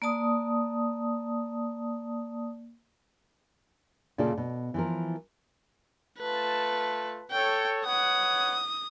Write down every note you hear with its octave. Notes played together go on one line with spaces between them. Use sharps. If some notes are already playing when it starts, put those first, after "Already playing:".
A#3 D5 A5 D#6
A#2 C#3 A3 F4 A4 D5
B2
E3 F3 A#4
A3 F4 B4 A5
A4 C#5 G5
B4 C#5 F#5 D#6